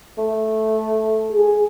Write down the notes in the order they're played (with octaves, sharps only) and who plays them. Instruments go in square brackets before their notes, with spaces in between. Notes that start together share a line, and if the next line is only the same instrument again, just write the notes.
[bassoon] A3
[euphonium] G#4